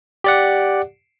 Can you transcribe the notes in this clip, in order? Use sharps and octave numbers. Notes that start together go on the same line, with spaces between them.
G4 D5 F#5